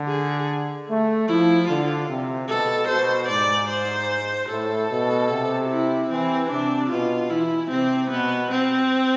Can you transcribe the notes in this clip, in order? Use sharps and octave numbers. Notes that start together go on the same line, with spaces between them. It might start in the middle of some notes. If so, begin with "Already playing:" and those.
Already playing: D3
G#4
A3
F3 E4
D3 F4
C3
B2 A4
B2 C5
G#2 D5
C5
A2 A4
B2
C3
E4
E3 C4
C3 D4
B2 F4
E3 E4
C3 C4
B2 B3
C4